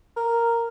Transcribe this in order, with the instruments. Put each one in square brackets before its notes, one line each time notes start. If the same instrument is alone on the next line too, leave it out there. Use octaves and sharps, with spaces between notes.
[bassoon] A#4